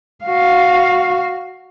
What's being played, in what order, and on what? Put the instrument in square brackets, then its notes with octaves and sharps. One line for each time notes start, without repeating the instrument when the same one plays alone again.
[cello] F#4 F5